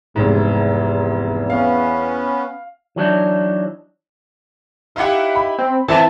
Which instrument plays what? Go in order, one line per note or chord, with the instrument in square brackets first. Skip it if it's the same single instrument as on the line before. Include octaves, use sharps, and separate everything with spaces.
[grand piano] F1 G#2 [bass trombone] E2
[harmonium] B3 C#4 [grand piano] F5
[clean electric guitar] E3 F#3 D4 D#4
[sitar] D#4 E4 G4 [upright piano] F5 F#5
[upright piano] B5
[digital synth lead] C4
[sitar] A2 [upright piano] E3 C4 E4 [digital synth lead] A5